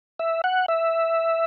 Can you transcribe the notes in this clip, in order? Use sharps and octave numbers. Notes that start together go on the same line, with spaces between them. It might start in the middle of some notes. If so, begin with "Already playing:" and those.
E5
F#5
E5